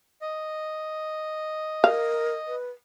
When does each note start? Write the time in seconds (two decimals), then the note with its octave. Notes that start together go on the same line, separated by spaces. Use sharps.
0.21 D#5
1.84 A#4 F5
2.48 B4